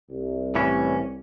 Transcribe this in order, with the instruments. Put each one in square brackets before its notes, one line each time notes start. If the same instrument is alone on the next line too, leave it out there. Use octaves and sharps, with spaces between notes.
[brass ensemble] C2
[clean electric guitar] A2 E3 C#4